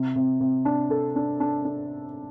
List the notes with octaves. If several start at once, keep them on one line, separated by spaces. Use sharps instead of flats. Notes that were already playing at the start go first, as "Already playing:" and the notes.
Already playing: C3
C3
C3
D4
A4
D4
D4
D4